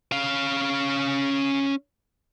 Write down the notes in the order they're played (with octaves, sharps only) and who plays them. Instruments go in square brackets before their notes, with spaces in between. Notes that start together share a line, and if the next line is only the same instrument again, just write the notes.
[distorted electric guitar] C#4 F5